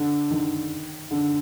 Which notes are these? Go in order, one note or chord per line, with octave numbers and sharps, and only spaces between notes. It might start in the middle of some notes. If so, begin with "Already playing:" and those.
Already playing: D3
D#3
D3